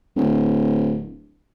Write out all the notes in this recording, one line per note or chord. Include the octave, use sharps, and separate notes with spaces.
D1